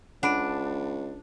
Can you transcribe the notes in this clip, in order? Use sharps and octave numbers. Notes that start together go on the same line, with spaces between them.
C#2 D4 F#5 B5 D7